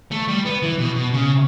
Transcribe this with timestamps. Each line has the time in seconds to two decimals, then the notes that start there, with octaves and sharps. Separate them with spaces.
0.11 A3
0.28 G3
0.46 B3
0.62 E3
0.79 B2
0.96 B2
1.13 C#3